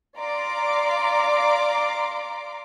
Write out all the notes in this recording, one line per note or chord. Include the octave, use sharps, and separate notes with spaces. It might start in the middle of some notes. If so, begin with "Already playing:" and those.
D5 F5 A#5 C6 D6